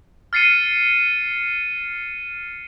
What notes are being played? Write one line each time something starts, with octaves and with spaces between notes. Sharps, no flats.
F6 A6 C7 C#7 D#7